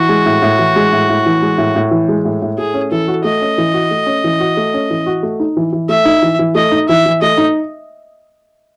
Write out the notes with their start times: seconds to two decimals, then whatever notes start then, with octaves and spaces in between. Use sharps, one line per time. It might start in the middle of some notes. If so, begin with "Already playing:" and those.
Already playing: E3 F#4
0.09 G#3
0.26 A2
0.42 A2
0.59 E3
0.76 G#3
0.92 A2
1.09 A2
1.26 E3
1.42 G#3
1.58 A2
1.76 A2
1.91 E3
2.08 G#3
2.25 A2
2.42 A2
2.58 A3 G#4
2.74 C#4
2.91 E3 A4
3.08 F#4
3.24 A3 D#5
3.41 C#4
3.58 E3
3.74 F#4
3.91 A3
4.06 C#4
4.24 E3
4.40 F#4
4.57 A3
4.74 C#4
4.90 E3
5.06 F#4
5.23 A3
5.40 D#4
5.57 E3
5.73 E3
5.89 A3 E5
6.05 D#4
6.22 E3
6.39 E3
6.55 A3 D#5
6.72 D#4
6.88 E3 E5
7.06 E3
7.22 A3 D#5
7.38 D#4